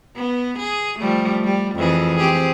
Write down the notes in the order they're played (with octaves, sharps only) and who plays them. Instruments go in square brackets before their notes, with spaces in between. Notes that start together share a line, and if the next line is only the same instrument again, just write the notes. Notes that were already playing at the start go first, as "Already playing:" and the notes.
[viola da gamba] B3
G#4
F3 G3 A3
G3
F2 E3 G#4
C4 G4 G#4